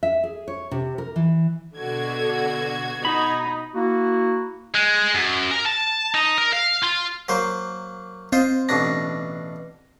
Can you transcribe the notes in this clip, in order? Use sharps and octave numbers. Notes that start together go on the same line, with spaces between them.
E5
G#4
C#5
C3
A#4
E3
B2 D3 F#4 G#6
D#4 B5
A#3 E4 F#4
G#3
F#2
A#4
A5
D#4
A#4
F5
F4
F#3 A#3 C5
C4 F4 C5 D#5
A1 B2 D4 A#6